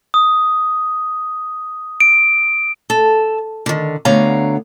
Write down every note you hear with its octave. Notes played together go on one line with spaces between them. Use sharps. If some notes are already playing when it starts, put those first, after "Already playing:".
D#6
D7
A4
D3 D#3
D2 D3 B3 C#5 F5 A#5